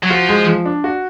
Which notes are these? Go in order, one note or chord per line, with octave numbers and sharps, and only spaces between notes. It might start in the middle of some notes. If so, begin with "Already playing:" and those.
F#3
F3 F#4
G#3
F3
D4
F#4